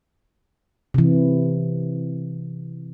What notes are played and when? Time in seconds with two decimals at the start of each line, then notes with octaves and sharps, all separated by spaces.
0.94 C3 E3